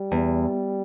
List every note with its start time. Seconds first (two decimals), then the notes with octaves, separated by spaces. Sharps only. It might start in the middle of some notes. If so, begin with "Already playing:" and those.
Already playing: G3
0.12 E2